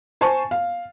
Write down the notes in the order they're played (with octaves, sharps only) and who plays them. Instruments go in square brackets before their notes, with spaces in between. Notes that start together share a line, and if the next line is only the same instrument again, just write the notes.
[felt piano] C5 G#5 A5 C#6
F5